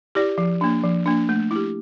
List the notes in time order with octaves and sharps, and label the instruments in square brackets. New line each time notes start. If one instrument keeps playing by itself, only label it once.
[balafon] E4 G4 D5
F3
A#3 D4
F3
A#3 D4
A3
E4 G4